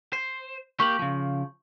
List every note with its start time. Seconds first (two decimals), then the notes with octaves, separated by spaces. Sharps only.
0.13 C5
0.80 A#3 G4 C#6 G6 F#7
0.99 C#3 F3